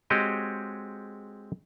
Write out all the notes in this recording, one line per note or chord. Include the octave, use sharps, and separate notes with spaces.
G#3 C4 F#4 G4 C#5 D#5